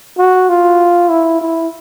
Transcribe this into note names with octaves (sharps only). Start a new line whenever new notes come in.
F#4
F4
E4
E4